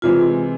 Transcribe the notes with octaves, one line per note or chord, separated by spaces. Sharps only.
C3 E3 G#3 F4